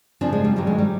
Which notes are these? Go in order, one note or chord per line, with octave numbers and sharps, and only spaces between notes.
F#2 C#3 F3 C4 D4
G#3
G3
G2 D#3 F#3 G3
G#3
G3